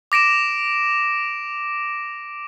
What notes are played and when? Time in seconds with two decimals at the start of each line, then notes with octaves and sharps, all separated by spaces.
0.12 D6 A#6 D7 E7